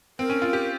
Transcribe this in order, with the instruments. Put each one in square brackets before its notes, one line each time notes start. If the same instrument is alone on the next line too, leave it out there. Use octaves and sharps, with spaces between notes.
[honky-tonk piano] C4 [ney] A#4
[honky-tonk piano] C#4
F4
G4